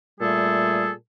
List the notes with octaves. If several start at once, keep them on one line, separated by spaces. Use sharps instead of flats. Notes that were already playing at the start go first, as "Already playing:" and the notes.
A#2 G3 A3 G#4 A4